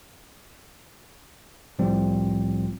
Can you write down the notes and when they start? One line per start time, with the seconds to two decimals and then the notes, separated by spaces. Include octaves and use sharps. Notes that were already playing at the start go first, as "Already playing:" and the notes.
1.79 C2 A2 F3 G3 C4